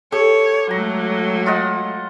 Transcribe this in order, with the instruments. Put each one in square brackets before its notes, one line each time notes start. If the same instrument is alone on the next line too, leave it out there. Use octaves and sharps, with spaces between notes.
[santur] G4 [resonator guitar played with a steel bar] A4 [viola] C#5
[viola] F#3 [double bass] G#3 A3 [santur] A#5
[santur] F4 D#5 F#5